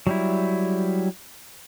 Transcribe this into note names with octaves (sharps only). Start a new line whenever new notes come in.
F#3 G3 E4